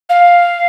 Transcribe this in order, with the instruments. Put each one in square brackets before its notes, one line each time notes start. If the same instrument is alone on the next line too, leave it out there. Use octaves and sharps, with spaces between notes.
[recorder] F5